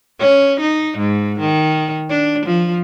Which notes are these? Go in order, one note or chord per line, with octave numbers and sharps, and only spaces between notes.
C#4
D#4
G#2
D#3
D4
F3